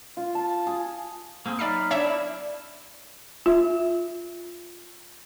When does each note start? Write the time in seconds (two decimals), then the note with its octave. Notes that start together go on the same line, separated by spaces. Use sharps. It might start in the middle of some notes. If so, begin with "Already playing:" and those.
0.17 F4
0.35 A5
0.67 G#4
1.46 A#3 C4 G#4
1.59 F#3 D#4 D5 E5 B5 F6 C7
1.91 D4 C#5 E5 A#5
2.04 E4
3.46 F4 E5